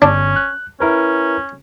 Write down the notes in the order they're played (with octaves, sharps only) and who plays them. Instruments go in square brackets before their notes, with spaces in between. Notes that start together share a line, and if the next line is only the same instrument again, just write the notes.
[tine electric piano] G1 [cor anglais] C#4 [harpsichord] D4
[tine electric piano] F#6
[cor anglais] C#4 [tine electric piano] E4 A#4 B4